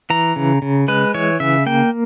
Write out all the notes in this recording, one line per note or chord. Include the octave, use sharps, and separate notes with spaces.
E3 A#5
C#3
C#3
G#3 B4
E3 C#5
C#3 E5
A#3 G5